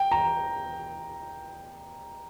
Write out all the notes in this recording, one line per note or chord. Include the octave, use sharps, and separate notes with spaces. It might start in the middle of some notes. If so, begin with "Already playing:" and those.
Already playing: G5
A#5